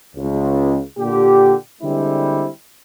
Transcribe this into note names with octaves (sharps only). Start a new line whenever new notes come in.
C#2
A#2 D3 G4
D3 G3 G#3 C4 E4